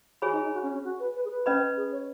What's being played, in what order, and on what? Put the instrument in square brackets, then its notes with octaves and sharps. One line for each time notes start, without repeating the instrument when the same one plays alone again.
[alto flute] F#4 [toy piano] G#4 C#5 G#5 B5
[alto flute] D#4
D#4
F#4
C#4
C#4
F#4
B4
B4
G#4
B4
[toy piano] C#4 B4 D#5 B5
[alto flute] G#4
C#5